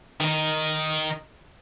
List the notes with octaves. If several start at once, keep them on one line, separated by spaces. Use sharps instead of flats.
D#3 D#4